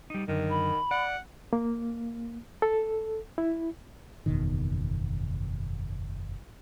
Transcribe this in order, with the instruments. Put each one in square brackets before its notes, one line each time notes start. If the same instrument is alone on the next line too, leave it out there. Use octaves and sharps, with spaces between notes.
[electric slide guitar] G3 D#4
[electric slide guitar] F#2 D3 [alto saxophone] D#3
[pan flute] B5
[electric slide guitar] D5 [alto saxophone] F#5
[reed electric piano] A#3
A4
E4
[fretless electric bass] F#1 E2 B2 D#3